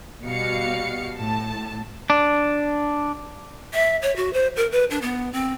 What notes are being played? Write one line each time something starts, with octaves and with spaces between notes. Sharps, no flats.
B2 G3 F#4 F5 C#7
A2 A5
D4
E5
C#5
F#4
C5
A#4
B4
D4
B3
C4